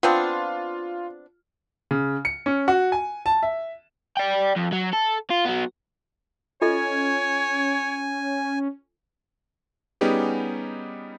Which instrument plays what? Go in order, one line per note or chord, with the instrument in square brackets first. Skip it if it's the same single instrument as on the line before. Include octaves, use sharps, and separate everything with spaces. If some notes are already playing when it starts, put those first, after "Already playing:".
[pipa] B3 C4 D4 [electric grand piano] F4
[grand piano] C#3
C#7
C#4
F#4
G#5
A5
E5
[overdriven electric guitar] D5 G5
F2
F#3
A4
F4
F#3 B3
[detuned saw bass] C#4 [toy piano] F4 A4 D#5 [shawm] C#5 [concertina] G#5
[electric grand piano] G3 B3 C#4 D#4 G4 G#4